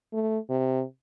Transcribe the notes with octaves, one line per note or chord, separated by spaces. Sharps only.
A3
C3